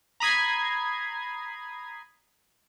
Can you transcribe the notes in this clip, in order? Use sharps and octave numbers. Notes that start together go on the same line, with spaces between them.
A#5 B5 D#6 G#6 C7